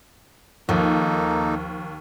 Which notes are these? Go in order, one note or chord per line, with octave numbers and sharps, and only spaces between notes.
D#2 F3 A#3 D#4 A4